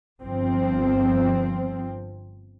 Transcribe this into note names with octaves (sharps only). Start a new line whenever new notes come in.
G1 F3 C4